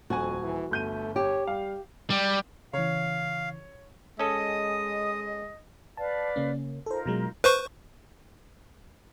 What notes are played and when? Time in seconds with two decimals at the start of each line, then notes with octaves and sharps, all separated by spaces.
0.10 D#1 F2 F#4 G#5
0.43 E3
0.71 G1 A3 G6 D#7
1.16 G4 C#5
1.47 G3 F5
2.10 G3
2.73 C#3 E3 C#5 F5
4.19 G#3 C#4 A4 D#5 D#6
5.97 B4 D5 F5 A5
6.36 C#3 A#3 C#4
6.86 D#4 F4 A4 A#4 C5
7.06 B2 F#3 G#3
7.44 B4 C5 C#6